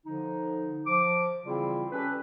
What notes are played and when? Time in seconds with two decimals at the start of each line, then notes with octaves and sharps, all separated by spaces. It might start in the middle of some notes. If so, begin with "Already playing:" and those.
0.06 D3 F3 D#4
0.86 F3 D6
1.45 C#3 E3 G3 C4 E4 F4
1.92 C#4 G4 A4 B4